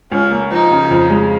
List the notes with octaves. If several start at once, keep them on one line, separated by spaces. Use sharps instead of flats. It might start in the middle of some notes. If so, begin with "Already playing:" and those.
C#2 C#4
A#3
F3 D#4
C#3
F2
G#3